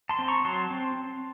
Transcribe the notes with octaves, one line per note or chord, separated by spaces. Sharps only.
A5 C6
C4
A#5 C#6
F#3 A5 C6
C4